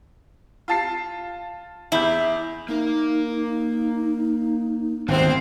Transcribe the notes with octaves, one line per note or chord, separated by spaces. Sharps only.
F4 A5 C7
E2 E4 G6
A#3 D#4 A#4
G#1 D2 B3 C4 E4 C5 E5